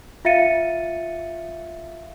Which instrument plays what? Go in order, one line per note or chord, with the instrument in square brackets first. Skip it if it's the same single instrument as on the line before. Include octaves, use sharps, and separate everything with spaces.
[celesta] F4 E5 F5 A6 C#7 D#7